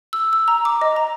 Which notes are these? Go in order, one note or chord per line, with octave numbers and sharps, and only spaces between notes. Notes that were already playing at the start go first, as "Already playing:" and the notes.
E6
E6
A#5
D6
D#5
A#5